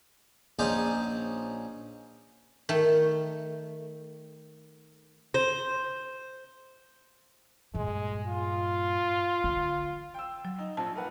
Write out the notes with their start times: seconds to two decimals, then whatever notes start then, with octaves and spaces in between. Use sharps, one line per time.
0.59 A#1 C#4 D#4 C5 D5
2.69 D#3 A3
5.34 C5
7.74 G2 A#2 G#3
8.27 F4
9.44 D3
10.14 G5 E6
10.45 F#3
10.59 D#4
10.77 A#1 F3 A5
10.95 A#3 B4 F#5